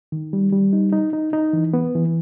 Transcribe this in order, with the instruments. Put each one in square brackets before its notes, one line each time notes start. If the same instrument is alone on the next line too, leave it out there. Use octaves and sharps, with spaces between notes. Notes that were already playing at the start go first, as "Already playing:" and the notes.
[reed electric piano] D#3
G3
G3
D#4
D#4
D#4
D#4
E3
B3
E3